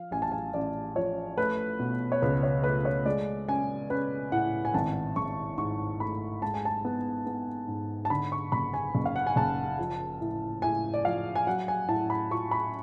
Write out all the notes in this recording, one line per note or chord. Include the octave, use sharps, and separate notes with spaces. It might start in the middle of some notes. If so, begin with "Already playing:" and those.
Already playing: F3 F5
A1 G#5
A5
G#5
A1 D5
F3 C#5
A3 B4
B2
C#5
C#2 B4
C#5
A3 B4
C#5
G#3 D5
C#4 G#5
C#4 B4
A2 F#5
G#5
G#1 A5
G#1 C#6
G#2 C#6
A3 B5
G#3 A5
G#5
A5
B3
B3
G#2
A5
D3 B5
C#6
F#1 B5
G#5
F#1
F5
F#5
G#5
F#1 A5
F3
A2
A2 G#5
D5
F3 F5
G#5
F#3 F#5
G#5
A2 A5
B5
F4 C#6
B5